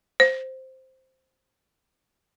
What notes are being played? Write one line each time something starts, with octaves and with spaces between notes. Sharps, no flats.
C5